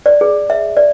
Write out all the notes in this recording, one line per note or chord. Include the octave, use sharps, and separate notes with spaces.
D5
G#4
E5
D5